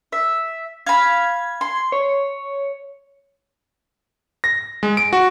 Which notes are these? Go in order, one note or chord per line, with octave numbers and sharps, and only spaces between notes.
E5
F5 B5 G#6
C6
C#5
A#6
G#3
D7
F#4